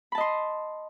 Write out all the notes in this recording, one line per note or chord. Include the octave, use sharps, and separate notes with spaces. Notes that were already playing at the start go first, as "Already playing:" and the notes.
D#5 A5 B5 C6